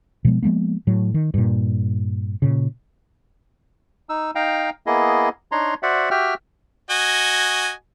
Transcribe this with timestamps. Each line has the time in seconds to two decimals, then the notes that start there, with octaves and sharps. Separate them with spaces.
0.25 B2 F3 G#3 B3
0.43 F3 G#3 A#3 B3
0.87 A2 F#3
1.14 D#3
1.34 G2 A#2
2.42 A#2 C#3
4.09 D#4 E6
4.35 D#4 F5 G5 A#5
4.86 A#3 B3 E4 G#4 D#5
5.52 D4 D#4 C#5 A#5 C6
5.83 F#4 C5 D5 E5 F#5
6.11 F#4 G4 E5 G5 F6
6.90 F#4 D#5 G#5